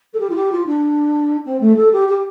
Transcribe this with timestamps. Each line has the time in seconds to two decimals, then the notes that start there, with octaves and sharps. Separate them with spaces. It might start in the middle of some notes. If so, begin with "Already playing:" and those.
0.13 A4
0.19 G4
0.29 F4
0.35 G4
0.51 F4
0.66 D4
1.45 C4
1.60 A3
1.76 A4
1.92 G4
2.08 G4